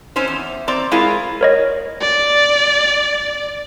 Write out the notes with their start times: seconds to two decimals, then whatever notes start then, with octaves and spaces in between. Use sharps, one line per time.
0.16 C4 C#4 D#4 C5
0.28 E2
0.68 C4 D5 A#5
0.91 G#3 E4 F4 G#4 A#4
1.41 A#4 C#5 D#5
2.01 D5